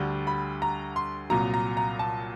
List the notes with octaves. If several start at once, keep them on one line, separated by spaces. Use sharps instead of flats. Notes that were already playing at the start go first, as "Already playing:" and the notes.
Already playing: D2 D3 G3
B5
A#5
C6
C2 A#2 F#3 A#5
A#5
A#5
A5